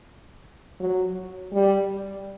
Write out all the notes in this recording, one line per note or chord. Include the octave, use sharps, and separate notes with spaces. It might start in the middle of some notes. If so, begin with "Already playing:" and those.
F#3
G3